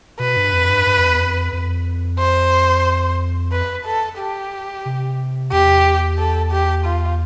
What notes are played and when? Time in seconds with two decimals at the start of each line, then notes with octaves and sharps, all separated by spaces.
0.19 B2 B4
0.37 G2
0.53 F2
0.70 G2
0.87 G2
0.98 F2
1.09 E2
1.19 F2
1.53 F2
2.19 C5
3.52 B4
3.85 A4
4.19 G4
4.86 C3
5.52 E2 G4
6.19 A4
6.52 G4
6.85 F4